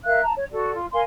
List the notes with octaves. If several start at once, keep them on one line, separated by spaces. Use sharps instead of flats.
A#4 E5 F5 F#6
A5 A#5
C#5
F#4 A4 D5
F4
A#4 F5 G#5 C6